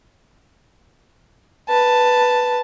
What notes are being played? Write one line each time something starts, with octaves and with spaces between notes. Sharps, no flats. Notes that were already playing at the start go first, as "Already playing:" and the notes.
B4 A5